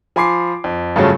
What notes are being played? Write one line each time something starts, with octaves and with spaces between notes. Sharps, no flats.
F3 G#5 B5 C6 D6 C7
F2
G2 C#3 F3 F#3 A3